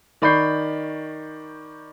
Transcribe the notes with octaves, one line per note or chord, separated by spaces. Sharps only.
D#3 D5 B5 C#6 G6 C7